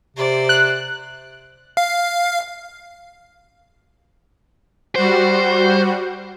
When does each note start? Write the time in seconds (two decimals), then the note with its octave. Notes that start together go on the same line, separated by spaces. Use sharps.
0.16 C3 C5 D5
0.49 F#6
1.77 F5
4.96 G3 F#4 C5